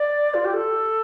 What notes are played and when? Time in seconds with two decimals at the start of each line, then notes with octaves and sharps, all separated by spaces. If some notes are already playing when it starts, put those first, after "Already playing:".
Already playing: D5
0.34 F4
0.45 G4
0.53 A4